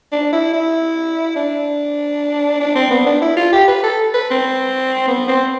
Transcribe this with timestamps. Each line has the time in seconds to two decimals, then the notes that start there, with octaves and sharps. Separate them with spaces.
0.12 D4
0.32 E4
0.53 E4
1.36 D4
2.60 D4
2.75 C4
2.91 B3
3.06 D4
3.22 E4
3.37 F4
3.53 G4
3.68 B4
3.83 A4
4.14 B4
4.31 C4
5.08 B3
5.28 C4